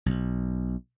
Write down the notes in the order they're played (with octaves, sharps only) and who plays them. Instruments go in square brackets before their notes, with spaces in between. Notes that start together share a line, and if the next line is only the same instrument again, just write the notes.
[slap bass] B1